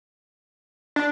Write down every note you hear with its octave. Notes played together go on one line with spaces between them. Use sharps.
D4